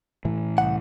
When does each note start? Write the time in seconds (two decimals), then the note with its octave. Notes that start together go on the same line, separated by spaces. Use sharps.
0.25 A2 E3
0.58 C2 F#5